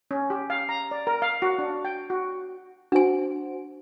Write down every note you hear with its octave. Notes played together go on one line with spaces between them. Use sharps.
C#4
G4
F5
A#5
D5
A#4
F5
F#4
D4
G5
F#4
D4 F#4 C5 G#5